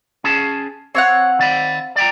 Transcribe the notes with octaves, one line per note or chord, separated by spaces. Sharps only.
C#4 G#4 A5
C4 C#5 F5 F#5
D#3 D5 B5
D5 G5 A#5